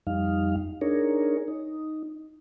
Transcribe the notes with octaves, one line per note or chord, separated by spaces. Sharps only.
F2 G3 D#4 F5
D4 D#4 G#4 A#4 C#5
D#4